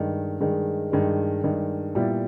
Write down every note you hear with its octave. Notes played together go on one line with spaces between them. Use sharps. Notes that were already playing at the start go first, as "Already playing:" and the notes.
Already playing: G2 D#3 G#3
G2 D#3 G#3
G2 D#3 G#3
G2 D#3 G#3
A#2 G3 B3 E4